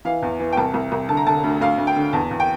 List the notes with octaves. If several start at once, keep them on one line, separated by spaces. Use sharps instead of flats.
E3 F5
E2
E3
G5
C2 A5
C2
C2
D3 A5
A#5
D3 A5
D2
D2 F5
D2
G5
D3
E2 A5
E2
G5